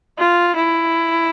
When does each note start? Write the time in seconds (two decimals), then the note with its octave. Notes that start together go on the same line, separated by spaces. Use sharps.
0.18 F4
0.56 E4